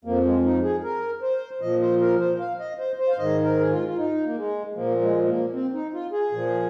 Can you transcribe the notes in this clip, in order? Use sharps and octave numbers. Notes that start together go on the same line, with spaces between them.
F2 F3 A#3
G#3
D#4
G#4
A#4
C5
A#2 F3 D#5
C5
A#4
C5
F5
D#5
C5
C5
F5
G#2 D#3 D#5
A#4
G#4
F4
F4
D#4
A#3
G#3
A#2 F3 A#3
G#3
A#3
C4
D#4
F4
G#4
A#2 F3